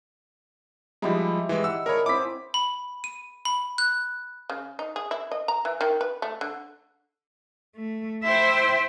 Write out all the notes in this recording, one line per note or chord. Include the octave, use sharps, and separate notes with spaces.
F3 G3 G#3 D#4 E4 G4
E3 G#3
F#5 E6
D4 G#4 A#4 C#5 B5
C4 E4 D6 B6
B5
D#7
B5
F#6
C#3
D#4
G#4
E4
D#5
A#5
E3
D#3
B4
A3
D3
A3
E4 C5 E5 G5